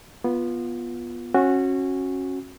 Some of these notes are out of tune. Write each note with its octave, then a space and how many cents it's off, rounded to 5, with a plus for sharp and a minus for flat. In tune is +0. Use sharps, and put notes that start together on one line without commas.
B3 -20 F4 +0
C#4 -25 F#4 -10